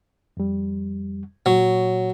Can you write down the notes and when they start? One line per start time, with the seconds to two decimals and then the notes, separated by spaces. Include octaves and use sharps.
0.37 F2 G3
1.46 A#2 F#3 C#5